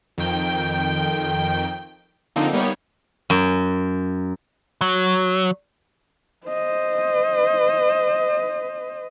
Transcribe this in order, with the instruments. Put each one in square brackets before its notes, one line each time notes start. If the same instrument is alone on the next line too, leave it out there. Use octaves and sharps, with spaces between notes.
[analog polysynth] F2 D#3 G5 G6
D3 F3 A#3 C4 D#4
G3 A#3 B3 D#4 C#5
[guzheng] F#2
[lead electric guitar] F#3
[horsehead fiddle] C5 D#5